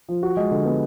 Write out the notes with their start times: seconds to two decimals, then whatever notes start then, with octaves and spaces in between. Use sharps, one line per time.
0.09 F3
0.23 F#4
0.37 G#3
0.51 D3
0.65 B3